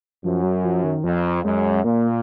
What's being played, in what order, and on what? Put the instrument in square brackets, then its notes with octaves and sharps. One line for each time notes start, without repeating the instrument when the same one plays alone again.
[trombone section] F#2 [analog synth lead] F3
[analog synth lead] F#3
F3
D#3
[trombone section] F2 [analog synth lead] F3
[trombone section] F#2 [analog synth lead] G#3
[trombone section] A#2 [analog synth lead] A#3